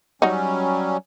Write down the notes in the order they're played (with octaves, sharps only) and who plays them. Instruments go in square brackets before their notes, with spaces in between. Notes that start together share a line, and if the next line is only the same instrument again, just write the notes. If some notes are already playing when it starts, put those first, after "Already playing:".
[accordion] F#3 G3 C#4 [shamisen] D#4 F#4